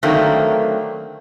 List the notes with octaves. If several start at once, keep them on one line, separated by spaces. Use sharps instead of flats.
D3 D#3 F#3 A3 A#3 C4